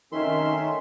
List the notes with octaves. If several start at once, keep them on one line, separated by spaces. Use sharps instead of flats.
F#2 C3 D#3 A3 C#4 A#4 E5 C6